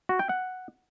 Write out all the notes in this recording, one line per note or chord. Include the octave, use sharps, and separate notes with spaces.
F#4
G5
F#5